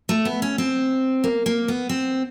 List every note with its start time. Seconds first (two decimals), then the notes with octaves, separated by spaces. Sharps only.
0.09 A3
0.25 B3
0.42 C#4
0.58 C4
1.24 A#3
1.46 A#3
1.68 B3
1.89 C4